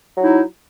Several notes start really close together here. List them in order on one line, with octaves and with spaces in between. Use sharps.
F#3 E4 D#4